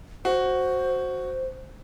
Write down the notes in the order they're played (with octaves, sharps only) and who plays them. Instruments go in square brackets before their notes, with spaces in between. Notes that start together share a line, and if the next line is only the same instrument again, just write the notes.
[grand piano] F#4 [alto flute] C5